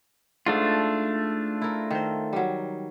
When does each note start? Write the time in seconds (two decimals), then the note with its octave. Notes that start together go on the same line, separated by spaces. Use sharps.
0.46 G#2 A3 D4 F4
1.62 E4 A#4
1.91 D#3 C5
2.33 F#3 G3